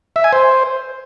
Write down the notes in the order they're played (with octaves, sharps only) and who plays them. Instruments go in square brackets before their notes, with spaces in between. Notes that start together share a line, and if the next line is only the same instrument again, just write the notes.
[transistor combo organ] E5
G#5
C5